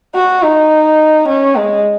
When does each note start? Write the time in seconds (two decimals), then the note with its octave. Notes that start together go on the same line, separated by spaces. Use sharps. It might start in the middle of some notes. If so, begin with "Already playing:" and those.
0.15 F#4
0.43 D#4
1.28 C#4
1.56 G#3